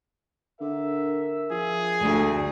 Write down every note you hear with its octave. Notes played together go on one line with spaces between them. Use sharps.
D3 A#4 E5
F3 G#4
D2